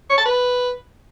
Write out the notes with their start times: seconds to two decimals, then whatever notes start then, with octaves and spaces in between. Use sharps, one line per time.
0.10 C#5
0.18 A5
0.26 B4